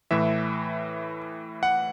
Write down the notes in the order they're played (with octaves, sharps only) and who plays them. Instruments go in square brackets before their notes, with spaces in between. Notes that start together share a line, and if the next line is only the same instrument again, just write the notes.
[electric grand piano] A2 E3 E5
F#5